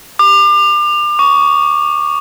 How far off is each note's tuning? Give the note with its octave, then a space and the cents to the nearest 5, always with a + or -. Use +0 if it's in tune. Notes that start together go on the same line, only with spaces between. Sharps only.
D6 +35
C#6 +20